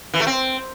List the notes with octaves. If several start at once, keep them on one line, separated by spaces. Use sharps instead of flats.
E3
A3
C4